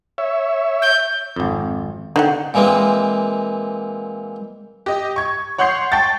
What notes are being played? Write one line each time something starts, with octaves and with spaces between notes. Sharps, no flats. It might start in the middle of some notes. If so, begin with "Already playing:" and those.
C#5 E5
G6
G#1 F2
D3 D#4 E5 F#5 G5
A#2 E3 G#3 A#3 C4
G4 D#5
C#6 G#6
C#5 F#5 C6 C#6 G6 C7
G5 A5 C#6 A6